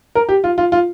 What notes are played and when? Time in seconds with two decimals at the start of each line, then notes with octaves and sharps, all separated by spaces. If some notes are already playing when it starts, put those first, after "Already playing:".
0.15 A#4
0.29 G4
0.44 F4
0.58 F4
0.72 F4